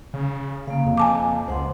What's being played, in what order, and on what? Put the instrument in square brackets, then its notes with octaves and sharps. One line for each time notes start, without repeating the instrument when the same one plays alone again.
[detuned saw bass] C#3
[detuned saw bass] C#3 [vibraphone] A#3 F5
[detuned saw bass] F2
[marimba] G#5 A5 D6
[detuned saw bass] C#2 [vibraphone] C5 F#5 C6